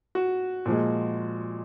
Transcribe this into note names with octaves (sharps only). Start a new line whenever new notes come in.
F#4
A#2 F3 G#3